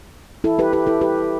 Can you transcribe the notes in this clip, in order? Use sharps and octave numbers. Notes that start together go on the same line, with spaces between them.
E4 A4
G4 B4
G4 B4
E4 A4
G4 B4